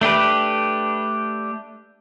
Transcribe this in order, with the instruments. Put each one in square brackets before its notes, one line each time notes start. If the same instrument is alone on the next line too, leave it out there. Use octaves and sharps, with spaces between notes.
[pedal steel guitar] A3 D4 G4 B4